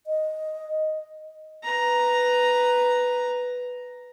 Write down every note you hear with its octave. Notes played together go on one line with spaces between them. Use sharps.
D#5
B4 A#5